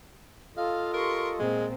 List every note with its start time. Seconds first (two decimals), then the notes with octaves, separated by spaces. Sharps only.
0.57 F4 A4 D#5 F5
0.94 G4 A#4 C6 C#6
1.39 A#2 G#3 C4